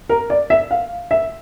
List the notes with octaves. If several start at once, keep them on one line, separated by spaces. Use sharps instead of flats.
A#4
D5
E5
F5
E5